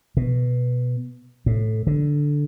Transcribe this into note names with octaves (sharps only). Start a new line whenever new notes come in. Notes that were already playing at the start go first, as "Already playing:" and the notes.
B2
A2
D3